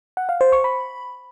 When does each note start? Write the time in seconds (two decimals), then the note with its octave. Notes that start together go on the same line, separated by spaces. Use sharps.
0.17 F#5
0.29 F5
0.41 C5
0.52 C#6
0.64 B5